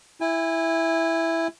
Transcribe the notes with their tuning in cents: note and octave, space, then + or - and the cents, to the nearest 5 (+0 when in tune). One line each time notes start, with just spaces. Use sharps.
E4 +0 G#5 -35